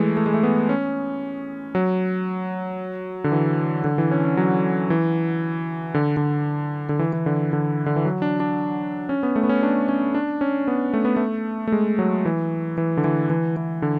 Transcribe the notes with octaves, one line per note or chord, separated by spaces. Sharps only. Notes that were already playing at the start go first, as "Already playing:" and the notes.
Already playing: E3 G#3 A3
A3
G#3
A3
B3
C#4
F#3
D3
E3
D3
E3
C#4
C#4
F#3
E3
D3
D3
D3
E3
E3
D3
D3
D3
E3
F#3
D4
D4
C#4
B3
A3
B3
C#4
D4
C#4
D4
C#4
B3
A3
B3
A3
A3
G#3
F#3
E3
E3
D3
E3
E3
E3
D3